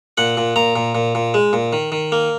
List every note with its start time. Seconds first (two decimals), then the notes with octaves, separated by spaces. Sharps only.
0.18 A#2 F#5
0.37 A#2
0.56 A#2 A#5
0.76 A#2
0.95 A#2
1.15 A#2
1.34 G#3
1.53 A#2
1.73 D#3
1.92 D#3
2.12 A#3